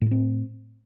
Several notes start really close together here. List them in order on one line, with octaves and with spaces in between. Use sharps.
A2 A3 C4